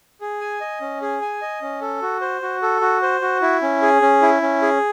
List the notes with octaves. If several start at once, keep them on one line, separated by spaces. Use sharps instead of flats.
G#4
G#5
D#5
C#4
G#4
G#5
D#5
C#4
A4
F#4
C5
F#4
A4
F#4
C5
F#4
E4
C#4
G#4
C#4
E4
C#4
G#4